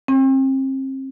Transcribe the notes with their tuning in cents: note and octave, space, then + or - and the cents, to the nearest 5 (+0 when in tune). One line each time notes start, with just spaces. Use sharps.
C4 +35